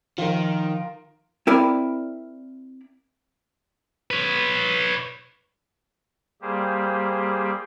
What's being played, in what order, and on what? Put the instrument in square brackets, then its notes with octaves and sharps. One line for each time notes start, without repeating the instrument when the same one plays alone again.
[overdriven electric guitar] D#3 [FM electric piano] F3 [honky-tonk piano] F4 A#4
[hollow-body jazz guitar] C4 E4 A#4 D5 B5
[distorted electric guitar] B4 C#5
[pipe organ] G3 A#3 G4 G#4 C5